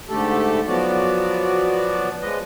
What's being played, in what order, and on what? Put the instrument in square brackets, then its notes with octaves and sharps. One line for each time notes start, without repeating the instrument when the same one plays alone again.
[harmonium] G#2 D3 A3 G4 A4 A5
F3 F#3 B3 F#4 D5
F3 G#3 B4 D#5